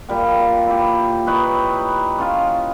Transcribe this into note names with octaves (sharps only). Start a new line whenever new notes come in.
A#2 G3 G5
E4 G4
D#4 E4 B4 C#5
C#4 F4